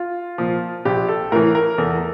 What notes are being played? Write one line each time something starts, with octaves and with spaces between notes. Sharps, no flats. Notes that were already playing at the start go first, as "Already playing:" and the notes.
Already playing: F4
A#2 F3
A#1 G4
A4
A2 E3 A#4
A#4
E2 A4